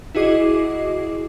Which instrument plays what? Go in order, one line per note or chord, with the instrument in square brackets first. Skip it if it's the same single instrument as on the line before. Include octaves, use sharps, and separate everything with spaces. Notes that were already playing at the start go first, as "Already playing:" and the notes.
[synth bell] E4 F#4 G#4 D#5 D6 C7